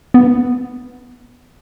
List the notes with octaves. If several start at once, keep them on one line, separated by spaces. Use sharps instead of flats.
B3